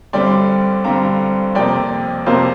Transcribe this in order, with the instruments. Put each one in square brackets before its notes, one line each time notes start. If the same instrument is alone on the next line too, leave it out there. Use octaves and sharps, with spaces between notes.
[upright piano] G2 D3 G3 C4 D5 G5
G2 D3 G3 C4 F5 A#5
F2 C3 A#3 D5 G5
F2 C3 A#3 C5 F5